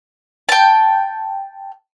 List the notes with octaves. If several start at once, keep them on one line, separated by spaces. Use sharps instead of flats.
G5 A5